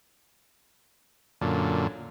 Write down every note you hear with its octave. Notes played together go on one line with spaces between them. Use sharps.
F#2 A#2 D3